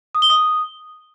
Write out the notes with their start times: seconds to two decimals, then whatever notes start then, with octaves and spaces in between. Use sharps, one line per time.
0.15 D#6
0.22 G7
0.30 D#6